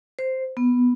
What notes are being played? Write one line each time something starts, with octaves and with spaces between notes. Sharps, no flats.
C5
B3